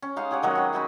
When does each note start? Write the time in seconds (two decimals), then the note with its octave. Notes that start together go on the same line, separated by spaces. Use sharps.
0.02 C#4
0.16 G#3 D#4 F5 F#5
0.31 G4 G#4 C#5 F#5
0.43 D#3 F#3 G#3
0.55 C4 B4
0.73 C#4 F#4 G#5 B5